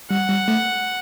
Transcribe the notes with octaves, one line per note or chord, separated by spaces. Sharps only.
G3 F#5
G3
A3